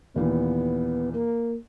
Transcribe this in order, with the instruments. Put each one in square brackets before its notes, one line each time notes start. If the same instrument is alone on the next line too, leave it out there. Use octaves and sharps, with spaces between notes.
[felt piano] D#2 A#2 E3 [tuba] B3
[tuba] A#3